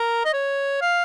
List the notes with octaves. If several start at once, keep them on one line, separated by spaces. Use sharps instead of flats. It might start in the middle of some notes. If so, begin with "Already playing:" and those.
Already playing: A#4
D#5
C#5
F5